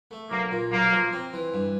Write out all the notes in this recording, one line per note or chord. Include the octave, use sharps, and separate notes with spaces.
A3
B1 A#3
A#2
B1 A#3
F3
C4
E3
G2